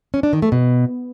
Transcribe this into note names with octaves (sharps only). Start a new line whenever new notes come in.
C#4
D4
D#3
A3
B2